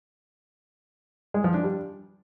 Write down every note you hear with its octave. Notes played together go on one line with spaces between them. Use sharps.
G#3
F3
D4
G3